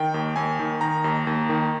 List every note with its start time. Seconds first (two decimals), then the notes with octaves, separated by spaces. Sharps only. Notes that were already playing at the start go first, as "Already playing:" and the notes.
Already playing: D#3 G5
0.14 D#2
0.36 D#2 G#5
0.59 D#3
0.81 D#3 A#5
1.04 D#2
1.27 D#2
1.49 D#3